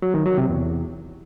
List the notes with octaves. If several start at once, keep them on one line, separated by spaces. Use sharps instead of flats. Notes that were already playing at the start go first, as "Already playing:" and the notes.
F#3
D#3
F#3
C3
E2